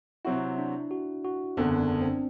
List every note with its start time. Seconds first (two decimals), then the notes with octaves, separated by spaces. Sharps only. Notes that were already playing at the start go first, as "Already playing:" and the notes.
0.25 C3 F#3 C4 E4 F#4
0.58 D4
0.91 F#4
1.25 F#4
1.57 F#1 E2 D3 C4
1.79 D4
2.01 C4